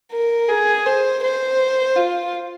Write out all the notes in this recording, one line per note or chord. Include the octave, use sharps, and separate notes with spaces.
A#4
G#4
C5
C5
F4